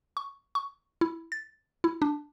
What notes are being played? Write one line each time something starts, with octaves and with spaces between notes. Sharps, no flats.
C#6
C#6
E4
A6
E4
D4